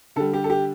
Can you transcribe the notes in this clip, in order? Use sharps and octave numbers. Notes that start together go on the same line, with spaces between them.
D3 G3 A4
G4
A4
G4